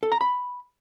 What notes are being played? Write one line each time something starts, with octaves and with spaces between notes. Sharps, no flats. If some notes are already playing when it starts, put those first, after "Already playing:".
A4
A#5
B5